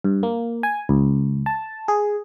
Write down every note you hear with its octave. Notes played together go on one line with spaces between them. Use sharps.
G2
A#3
G#5
C#2
A5
G#4